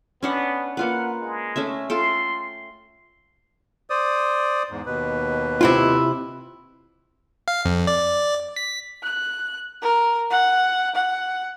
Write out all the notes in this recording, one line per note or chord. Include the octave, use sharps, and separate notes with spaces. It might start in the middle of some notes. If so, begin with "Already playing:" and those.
B3 C#4 D4 F#5
A#3 F4 B4 F#5
G#3
A3 C#4 E5
F4 A4 G5 C6
C5 D5 D#6
E2 G#2
D#2 B2 B4
C3 E4 F4
F5
F2
D5
B6
F#6
A#4
F#5
F#5